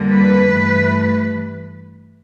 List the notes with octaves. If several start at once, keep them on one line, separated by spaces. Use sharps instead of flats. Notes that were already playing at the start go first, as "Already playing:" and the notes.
Already playing: F2 D3 G3 A#3
B4
G2 E3 A3